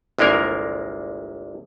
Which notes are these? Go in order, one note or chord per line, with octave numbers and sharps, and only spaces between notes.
G1 C2 G#3 A#3 A#4